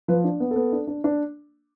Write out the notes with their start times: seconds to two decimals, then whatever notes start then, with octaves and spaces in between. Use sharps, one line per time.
0.08 F3 B4
0.24 D4
0.40 B3
0.51 B3 A4
0.72 D4
0.87 D4
1.04 D4